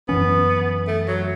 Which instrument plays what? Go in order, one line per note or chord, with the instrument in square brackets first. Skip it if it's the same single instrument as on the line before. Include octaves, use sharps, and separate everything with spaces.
[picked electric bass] F#2 E3 C#4 [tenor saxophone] B3
[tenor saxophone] A3
F#3